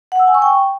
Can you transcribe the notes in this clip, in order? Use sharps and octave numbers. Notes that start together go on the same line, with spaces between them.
F#5
E6
G#5
C#6
G5